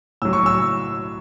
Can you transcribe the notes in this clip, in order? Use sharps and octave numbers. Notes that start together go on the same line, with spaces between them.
A2 F#3 E6
C#6
E6